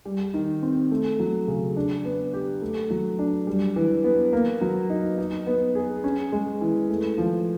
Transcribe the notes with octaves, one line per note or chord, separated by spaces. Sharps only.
G3
D#3
C4
A3
F#3
C#3
D4
B3
G4
A3
F#3
D4
G3
E3
B3
A#3
F#3
D#4
D#4
B3
G#4
C#4
G#3
E3
A3
F3